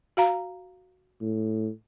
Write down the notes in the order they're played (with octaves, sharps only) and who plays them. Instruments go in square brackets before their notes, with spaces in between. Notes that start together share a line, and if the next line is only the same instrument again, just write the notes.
[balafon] F#4 F5 A#5
[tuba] A2